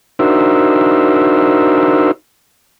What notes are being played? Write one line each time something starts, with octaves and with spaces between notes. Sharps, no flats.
D4 D#4 F#4 A#4 C5 E5